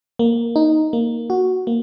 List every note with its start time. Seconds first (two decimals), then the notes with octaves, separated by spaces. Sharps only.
0.19 A#3
0.56 D#4
0.93 A#3
1.30 F#4
1.67 A#3